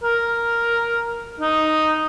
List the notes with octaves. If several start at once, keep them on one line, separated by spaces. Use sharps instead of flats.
A#4
D#4